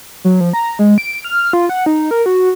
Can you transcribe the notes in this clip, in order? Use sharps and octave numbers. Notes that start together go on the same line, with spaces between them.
F#3
F3
A#5
G#3
D7
F6
F4
F#5
D#4
A#4
F#4